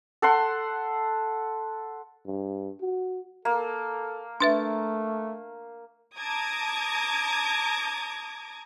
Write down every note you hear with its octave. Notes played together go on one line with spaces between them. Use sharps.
A4 F#5 C6
G2
F#4
A#3 A4
A3 D4 B4 E5
A5 A#5 D6 D#6 G#6 A#6